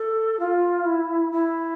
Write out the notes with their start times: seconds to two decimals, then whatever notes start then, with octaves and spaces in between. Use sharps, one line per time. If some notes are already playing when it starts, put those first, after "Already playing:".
Already playing: A4
0.39 F4
0.85 E4
1.32 E4